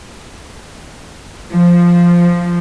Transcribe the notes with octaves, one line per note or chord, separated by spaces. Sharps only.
F3